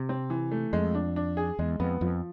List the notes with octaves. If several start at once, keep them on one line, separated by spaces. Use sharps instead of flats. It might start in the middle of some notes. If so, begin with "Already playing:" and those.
Already playing: C3
C4
E3
A3
F2 G#3
D4
D4
G#4
E2 G#3
F2 B3
F2 F3